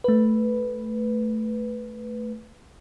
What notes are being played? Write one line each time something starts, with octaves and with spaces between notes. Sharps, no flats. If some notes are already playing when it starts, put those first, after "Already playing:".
A3 B4